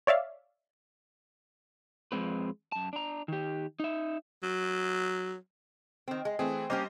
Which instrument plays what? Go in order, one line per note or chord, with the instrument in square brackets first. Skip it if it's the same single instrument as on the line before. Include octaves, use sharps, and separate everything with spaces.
[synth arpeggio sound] C#5 D5 E5 F5
[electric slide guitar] F2 G#2 G#3 C4 B4
F#2 A5
D4 A#5
D#3 G4
D#4 E5
[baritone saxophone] F#3
[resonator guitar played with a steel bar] D#3 C4
G#3
[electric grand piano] E3 A3 G#4 [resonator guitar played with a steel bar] C4
[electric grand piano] G3 C5 D#5 [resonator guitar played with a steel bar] A#3 C#4 G4